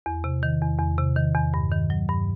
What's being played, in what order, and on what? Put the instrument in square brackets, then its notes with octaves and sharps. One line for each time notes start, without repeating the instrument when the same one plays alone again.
[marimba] E2
C3
D#3
E2
E2
C3
D#3
E2
G2
D#3
F#3
G2